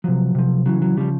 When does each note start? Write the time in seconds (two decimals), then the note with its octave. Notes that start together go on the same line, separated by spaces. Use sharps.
0.04 C3 F3 F#3
0.35 C3 F3
0.66 C#3 E3 F#3
0.82 F#3
0.97 C#3 F3 G3